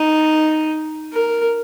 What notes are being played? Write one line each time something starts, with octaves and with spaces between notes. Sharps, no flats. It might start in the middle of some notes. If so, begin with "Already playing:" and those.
Already playing: D#4
A#4